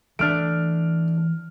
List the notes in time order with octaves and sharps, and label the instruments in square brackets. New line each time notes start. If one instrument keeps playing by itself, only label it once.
[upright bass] E3 [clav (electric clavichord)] A3 D4 [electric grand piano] F6 D7